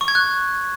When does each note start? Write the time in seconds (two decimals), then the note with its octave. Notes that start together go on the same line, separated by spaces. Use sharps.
0.01 C#6
0.08 G#6
0.15 F#6